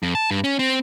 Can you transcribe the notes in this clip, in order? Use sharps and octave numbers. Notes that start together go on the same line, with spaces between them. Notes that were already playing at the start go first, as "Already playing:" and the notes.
F2
A5
G2
C#4
C4